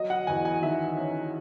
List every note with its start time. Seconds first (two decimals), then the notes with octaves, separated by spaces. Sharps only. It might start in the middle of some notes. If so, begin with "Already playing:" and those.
Already playing: F#3 D#5
0.10 F#5
0.27 E2 G#5
0.45 G#5
0.62 D#3 E5
0.97 C#4